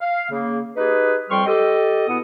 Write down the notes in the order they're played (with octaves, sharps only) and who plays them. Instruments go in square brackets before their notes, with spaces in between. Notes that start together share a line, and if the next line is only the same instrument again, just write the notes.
[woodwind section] F5
C#3 A#3
D#4 G4 G#4 B4
F2 G3 G5 C6 C#6 F6
G4 A4 D#5
B2 B3 E4 F#5 D#6